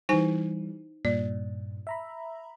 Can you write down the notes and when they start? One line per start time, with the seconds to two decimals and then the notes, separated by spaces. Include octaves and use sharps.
0.09 E3 G3 D#4 C5 G#5
1.05 G2 A#2 D5
1.87 E5 A#5 B5